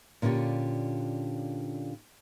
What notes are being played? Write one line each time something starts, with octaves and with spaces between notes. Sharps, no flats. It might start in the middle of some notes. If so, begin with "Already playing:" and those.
A#2 D3 C#4 F4 G4